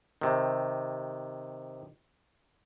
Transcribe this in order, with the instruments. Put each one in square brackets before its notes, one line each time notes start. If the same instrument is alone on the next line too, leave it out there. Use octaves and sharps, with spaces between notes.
[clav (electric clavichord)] C3 D#3